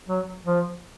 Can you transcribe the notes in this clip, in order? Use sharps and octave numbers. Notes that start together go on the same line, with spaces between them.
F#3
F3